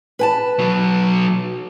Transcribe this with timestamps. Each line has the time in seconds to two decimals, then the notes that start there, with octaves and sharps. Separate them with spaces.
0.19 B4 G#5 A5
0.59 B2 F#3